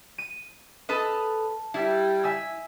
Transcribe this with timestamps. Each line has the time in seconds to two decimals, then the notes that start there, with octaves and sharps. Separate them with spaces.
0.18 D#7
0.89 A4 B4 D#5 A5 F6
1.74 G3 E4
2.23 E5 G#5 E6